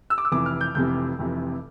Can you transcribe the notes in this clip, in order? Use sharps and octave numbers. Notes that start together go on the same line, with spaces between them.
E6
D6
E6
F1 F2 C3 E3 D6
F6
G6
F1 F2 C3 E3 G6
F1 F2 C3 E3